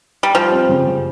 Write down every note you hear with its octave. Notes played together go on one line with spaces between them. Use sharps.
G3
F3 G3
C4
C#3
C#3